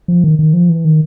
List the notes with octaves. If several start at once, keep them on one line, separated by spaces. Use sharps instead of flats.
F3
D#3
D#3
F3
E3
D#3